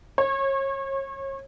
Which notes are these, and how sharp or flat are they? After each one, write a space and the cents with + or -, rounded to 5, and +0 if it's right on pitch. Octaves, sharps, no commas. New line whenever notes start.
C#5 -35